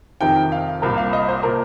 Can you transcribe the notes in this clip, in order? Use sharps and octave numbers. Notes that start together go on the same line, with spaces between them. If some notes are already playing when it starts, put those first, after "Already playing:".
F2 C3 D#3 G5
F5
C2 A#2 A#4
F5
D#5
C5
A#2 A#4